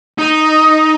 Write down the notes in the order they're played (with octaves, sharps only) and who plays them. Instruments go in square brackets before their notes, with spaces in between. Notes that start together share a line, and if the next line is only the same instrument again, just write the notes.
[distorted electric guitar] D#4